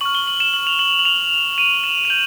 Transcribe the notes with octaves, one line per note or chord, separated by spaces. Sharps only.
C#6 F6 F#7
G7
F#7
E7
F#7
F7
F#7
F#7
F7
D#7
E7
F7
G6 F#7